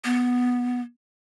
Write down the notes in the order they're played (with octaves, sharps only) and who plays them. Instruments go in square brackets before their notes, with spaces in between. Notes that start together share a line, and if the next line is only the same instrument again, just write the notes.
[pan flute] B3